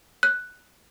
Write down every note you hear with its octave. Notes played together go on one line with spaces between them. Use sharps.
F#6